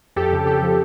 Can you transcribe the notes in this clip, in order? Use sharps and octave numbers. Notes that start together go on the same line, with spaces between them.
F2 G4 A4
C#3
F2 G4 A4
F3